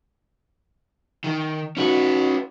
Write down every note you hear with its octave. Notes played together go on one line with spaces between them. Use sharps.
D#3
C#4 D#4 F#4 B4